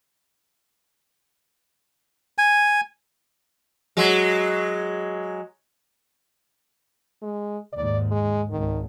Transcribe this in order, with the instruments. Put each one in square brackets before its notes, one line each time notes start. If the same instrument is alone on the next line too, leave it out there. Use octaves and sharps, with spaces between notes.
[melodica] G#5
[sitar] F#3 G#3
[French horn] G#3
[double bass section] D#2 G#2 [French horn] D5
[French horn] G#3
[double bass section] G#1 C#2 [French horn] D#3